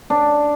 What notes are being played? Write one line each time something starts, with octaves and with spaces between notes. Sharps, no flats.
D4